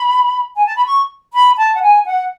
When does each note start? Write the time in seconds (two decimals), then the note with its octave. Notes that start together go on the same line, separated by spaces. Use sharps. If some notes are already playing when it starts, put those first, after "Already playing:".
Already playing: B5
0.56 G#5
0.66 A5
0.76 B5
0.86 C#6
1.33 B5
1.58 A5
1.75 F#5
1.82 G#5
2.06 F#5